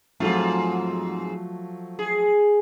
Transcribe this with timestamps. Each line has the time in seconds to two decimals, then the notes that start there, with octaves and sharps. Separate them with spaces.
0.20 G#2 F3 F#3 A3 C4 F4
1.99 G#4